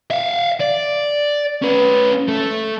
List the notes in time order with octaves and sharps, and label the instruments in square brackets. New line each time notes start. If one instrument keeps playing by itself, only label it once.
[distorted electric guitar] E5 F5
D5
C#4 B4
A3